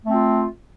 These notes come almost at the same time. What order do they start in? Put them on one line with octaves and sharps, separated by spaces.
A3 C4 F4